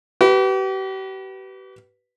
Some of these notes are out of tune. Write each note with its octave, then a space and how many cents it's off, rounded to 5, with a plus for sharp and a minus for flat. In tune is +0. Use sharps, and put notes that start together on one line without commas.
G4 -40 B4 +0